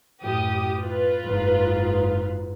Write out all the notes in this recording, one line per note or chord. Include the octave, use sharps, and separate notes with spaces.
F#2 A2 G4 D#6
F4 B4
F#1 G#2